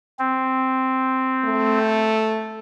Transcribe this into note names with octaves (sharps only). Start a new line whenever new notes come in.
C4
A3